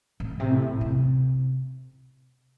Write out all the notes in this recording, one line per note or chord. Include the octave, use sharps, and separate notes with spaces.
A2
C3
A2
C3